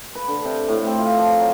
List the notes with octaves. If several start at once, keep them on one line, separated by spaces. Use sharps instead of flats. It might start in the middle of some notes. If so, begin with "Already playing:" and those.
B4
D3
C3
A2
C4
F4
F3
F#3